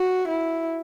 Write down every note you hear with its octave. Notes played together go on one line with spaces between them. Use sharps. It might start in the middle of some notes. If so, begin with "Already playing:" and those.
Already playing: F#4
E4